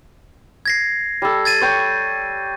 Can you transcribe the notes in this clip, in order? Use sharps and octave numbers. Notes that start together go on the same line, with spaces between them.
G#6 A#6 C7
G3 A4
G#6 A6 D#7
C#5 G5 C#6